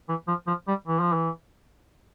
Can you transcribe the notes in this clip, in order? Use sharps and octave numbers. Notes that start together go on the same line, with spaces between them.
E3
F3
F3
G3
E3
F3
E3